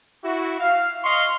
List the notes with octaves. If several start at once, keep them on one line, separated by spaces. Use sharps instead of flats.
E4 F#4
F5
D#5 F5 C6 C#6